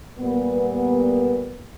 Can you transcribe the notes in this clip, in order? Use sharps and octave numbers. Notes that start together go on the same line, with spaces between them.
A#2 G3 B3